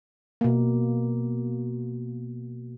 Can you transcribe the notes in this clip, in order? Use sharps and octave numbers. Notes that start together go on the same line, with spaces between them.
B2 A#3